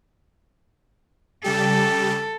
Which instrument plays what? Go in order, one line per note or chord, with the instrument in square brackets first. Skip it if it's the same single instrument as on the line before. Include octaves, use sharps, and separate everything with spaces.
[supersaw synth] C#3 G3 G4 [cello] A4